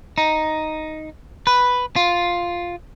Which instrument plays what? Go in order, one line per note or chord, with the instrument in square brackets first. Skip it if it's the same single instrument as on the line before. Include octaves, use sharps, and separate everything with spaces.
[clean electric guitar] D#4
B4
F4